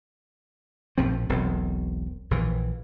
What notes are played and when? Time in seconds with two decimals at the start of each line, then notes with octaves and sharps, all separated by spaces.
0.98 A#1 A2 F3 C4
1.29 E1 B1 C4
2.31 A#1 E3